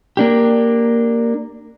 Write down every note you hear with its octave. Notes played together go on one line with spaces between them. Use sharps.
A#3 D4 G4